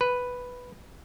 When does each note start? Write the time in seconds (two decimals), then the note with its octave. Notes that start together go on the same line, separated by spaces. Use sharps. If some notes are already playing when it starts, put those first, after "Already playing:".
0.01 B4